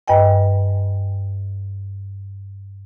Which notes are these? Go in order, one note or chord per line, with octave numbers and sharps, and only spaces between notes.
G2 B4 D#5 G5 G#5